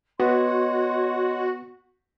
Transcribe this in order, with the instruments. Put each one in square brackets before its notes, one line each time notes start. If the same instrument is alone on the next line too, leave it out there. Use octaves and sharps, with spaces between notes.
[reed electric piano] B3 [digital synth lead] F#4 [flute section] C#5 D#5 C6